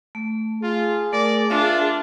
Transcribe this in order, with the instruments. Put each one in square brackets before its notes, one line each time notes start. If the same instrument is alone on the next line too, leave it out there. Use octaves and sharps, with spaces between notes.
[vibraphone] A3
[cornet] F4 [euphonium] G#4
[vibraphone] A3 A#4 [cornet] D5
[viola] D4 [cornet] F4 [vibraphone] E5